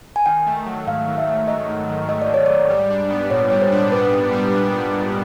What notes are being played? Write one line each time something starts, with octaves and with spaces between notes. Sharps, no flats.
G#5
D#3 G5
A3
F#3
G#2 F5
D#3
E5
A3
F#3 D#5
G#2
D#3
A3 D#5
D5
F#3 C#5
G#2 D5
G3
D4
B3
A#2 C#5
G3 C#5
C5
D4
B3 B4
A#2
G3
D4
B3
A#2